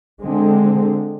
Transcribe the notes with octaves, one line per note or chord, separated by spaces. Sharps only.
D3 G#3 C4